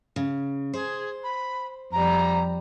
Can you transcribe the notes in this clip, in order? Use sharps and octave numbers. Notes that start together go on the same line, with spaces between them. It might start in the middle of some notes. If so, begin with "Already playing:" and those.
C#3
G#4 C5
B5
F2 G3 A#5